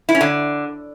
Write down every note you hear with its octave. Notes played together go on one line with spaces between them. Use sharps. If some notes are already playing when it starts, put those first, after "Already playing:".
E4
C#4
D3